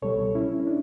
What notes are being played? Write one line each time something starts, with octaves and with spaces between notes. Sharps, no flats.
C#2 B2 G3 A4 C#5
C#4 E4
C#4
D4